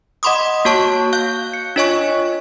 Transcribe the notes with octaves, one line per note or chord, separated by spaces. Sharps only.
D#5 F#5 B5 C6 D6 D#6
A#3 F#4 C#5 A5 C#6 D7
F5 F#6 G6
C#7
D4 F4 C#5 D#5 G#5 C#6